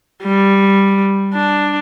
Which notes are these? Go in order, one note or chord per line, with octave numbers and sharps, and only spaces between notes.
G3
D4